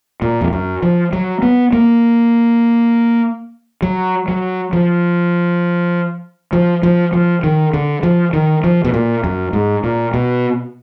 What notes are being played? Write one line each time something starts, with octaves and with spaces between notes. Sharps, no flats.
A#2
F2
F#2
F3
F#3
B3
A#3
F#3
F#3
F3
F3
F3
F3
D#3
D3
F3
D#3
F3
B2
A#2
F#2
G#2
A#2
B2